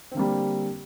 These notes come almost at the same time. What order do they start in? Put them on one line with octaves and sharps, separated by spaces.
C4 D3 A#3 G3